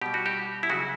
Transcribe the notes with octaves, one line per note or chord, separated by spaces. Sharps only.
B2 G3 G4
F#4
G4
E4
C#3 F#3 F#4